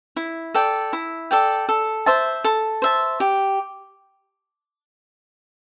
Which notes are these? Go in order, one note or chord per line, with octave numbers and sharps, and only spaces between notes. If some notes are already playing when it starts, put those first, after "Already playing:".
E4
A4 D5 G5
E4
A4 D5 G5
A4
C5 E5 A5
A4
C5 E5 A5
G4